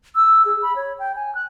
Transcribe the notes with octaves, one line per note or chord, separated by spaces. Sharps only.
E6
G#4
B5
C#5
G5
G#5
F#6